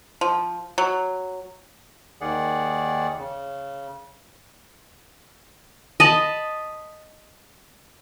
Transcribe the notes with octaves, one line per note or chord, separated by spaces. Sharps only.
F3
F#3
D#2 D#3 G#4 D5 F#5
C#3
D#5 A5 B5